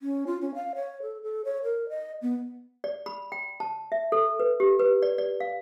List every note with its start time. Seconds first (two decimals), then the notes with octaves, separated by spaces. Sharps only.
0.01 C#4
0.27 F4
0.41 C#4
0.55 F5
0.75 C#5
1.02 A4
1.23 A4
1.45 C#5
1.64 A#4
1.89 D#5
2.22 B3
2.84 D5
3.06 B5
3.32 G5
3.60 A5
3.92 E5
4.12 A4
4.40 B4
4.60 G4
4.79 B4
5.02 D5
5.18 D5
5.40 F5